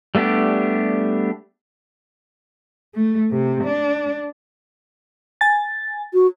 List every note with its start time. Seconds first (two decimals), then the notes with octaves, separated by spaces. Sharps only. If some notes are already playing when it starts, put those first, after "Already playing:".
0.15 G3 A3 B3 D4 G4
2.94 A3
3.31 C3
3.64 D4
5.41 G#5 A6
6.14 F#4